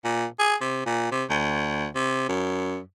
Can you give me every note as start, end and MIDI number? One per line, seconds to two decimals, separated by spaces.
0.04 0.26 46
0.39 0.56 68
0.61 0.83 48
0.86 1.11 46
1.11 1.24 48
1.29 1.87 38
1.95 2.27 48
2.29 2.79 42